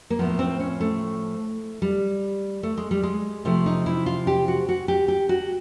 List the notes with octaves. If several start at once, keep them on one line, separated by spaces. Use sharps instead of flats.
A#3
A2 F3 B3
C4
C#4
A3
G3
A3
G#3
G3
G#3
C3 F3 A3
D#4
E4
F4
G4
F#4
F#4
G4
G4
F#4